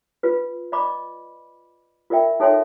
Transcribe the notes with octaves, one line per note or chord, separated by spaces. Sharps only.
F4 B4
D5 D#5 B5 D6
F4 A#4 D5 E5 G5
D#4 A4 C#5 E5 G5 C6